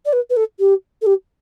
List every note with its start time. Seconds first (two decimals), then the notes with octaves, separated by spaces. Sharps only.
0.05 D5
0.12 B4
0.30 B4
0.36 A4
0.59 G4
1.01 A4
1.06 G4